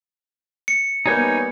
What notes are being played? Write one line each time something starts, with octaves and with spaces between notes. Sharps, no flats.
C#7
G3 A#3 B3 D#4 C#5 G#5 G6